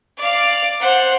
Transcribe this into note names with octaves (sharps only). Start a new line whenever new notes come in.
D5 F5
C5 F#5